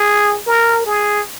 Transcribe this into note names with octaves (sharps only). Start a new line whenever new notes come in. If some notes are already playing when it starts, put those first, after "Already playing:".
Already playing: G#4
A#4
G#4